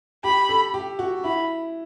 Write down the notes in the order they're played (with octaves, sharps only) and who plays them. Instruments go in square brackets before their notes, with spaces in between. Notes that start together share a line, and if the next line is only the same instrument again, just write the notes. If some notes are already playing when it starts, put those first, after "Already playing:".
[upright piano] G4 [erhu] B5
[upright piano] A4
G4
F#4
[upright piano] E4 [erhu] B5